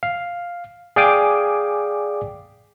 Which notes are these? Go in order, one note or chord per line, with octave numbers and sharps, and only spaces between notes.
F5
G#4 D5 F5 G5 G#5 D6